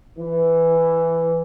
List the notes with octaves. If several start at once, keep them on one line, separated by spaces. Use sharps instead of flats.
E3